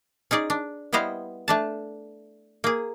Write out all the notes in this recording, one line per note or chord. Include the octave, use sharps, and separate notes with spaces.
C#4 D#4 G#4 D5
D4
G3 B3 E4 C5 D#5 F5
A3 D4 A5
A#3 G#4